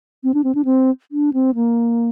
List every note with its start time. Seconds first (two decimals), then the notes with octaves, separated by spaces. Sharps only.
0.24 C4
0.34 D4
0.44 C4
0.55 D4
0.65 C4
1.12 D4
1.33 C4
1.55 A#3